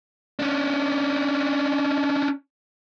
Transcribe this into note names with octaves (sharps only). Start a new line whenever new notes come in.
C#4 D4